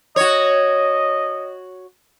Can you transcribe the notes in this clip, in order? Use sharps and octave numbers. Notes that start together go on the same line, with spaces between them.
F#4 C#5 D#5